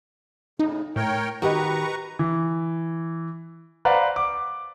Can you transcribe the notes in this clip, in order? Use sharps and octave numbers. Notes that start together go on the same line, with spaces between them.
A2 C#3 D#4
A2 A#4 C#5 G5
D#3 F#4 G4 B4 D#5 A#5 C#6
E3
B4 C5 D5 F5 F#5 A#5
D6